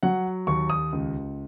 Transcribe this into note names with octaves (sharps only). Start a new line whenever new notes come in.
F#3 F#5
D#2 C#6
D#6
C#2